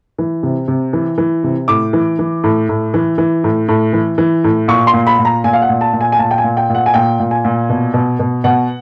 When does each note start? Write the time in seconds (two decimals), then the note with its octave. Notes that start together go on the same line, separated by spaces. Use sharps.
0.18 E3
0.43 C3
0.68 C3
0.93 E3
1.18 E3
1.44 C3
1.68 A2 D6
1.93 E3
2.19 E3
2.44 A2
2.69 A2
2.94 E3
3.18 E3
3.44 A2
3.68 A2
3.93 E3
4.18 E3
4.44 A2
4.68 A#2 C#6
4.87 C6
4.93 A#2
5.07 B5
5.19 A#2
5.25 A#5
5.44 A#2 G#5
5.53 F5
5.62 F#5
5.69 A#2
5.81 A5
5.93 A#2
6.01 G#5
6.12 G#5
6.19 A#2 A5
6.31 G5
6.38 G#5
6.44 A#2
6.57 G5
6.69 A#2
6.75 F#5
6.86 G#5
6.94 A#2 G5
7.20 A#2
7.31 G#5
7.45 A#2
7.69 B2
7.94 B2
8.19 B2
8.44 B2 F#5